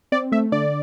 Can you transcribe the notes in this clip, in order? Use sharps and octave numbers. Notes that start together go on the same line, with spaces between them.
C4 D5
A3 E5
D3 D5